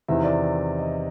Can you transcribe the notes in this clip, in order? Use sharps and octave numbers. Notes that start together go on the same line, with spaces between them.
E2 C3 D#3 E5
D5
D#5